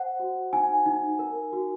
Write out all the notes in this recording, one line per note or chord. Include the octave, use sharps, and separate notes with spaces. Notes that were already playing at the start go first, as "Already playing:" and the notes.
Already playing: C5 F#5
F#4
D#4 G#5
D#4
A#4
F#4